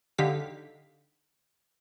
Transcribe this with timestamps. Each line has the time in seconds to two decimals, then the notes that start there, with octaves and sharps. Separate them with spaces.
0.18 D3 D#4 G4 F5 B6